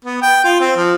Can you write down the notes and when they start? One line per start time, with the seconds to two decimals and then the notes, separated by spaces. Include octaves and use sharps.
0.05 B3
0.22 G5
0.44 F4
0.60 C4
0.76 F3